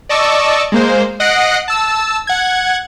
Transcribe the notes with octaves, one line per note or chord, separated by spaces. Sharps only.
D5 D#5 A5 C#6 D6 E6
G#3 A#3 C5
D#5 F#5 F#6 A#6 C7 D7
A5 E6
F#5 G#6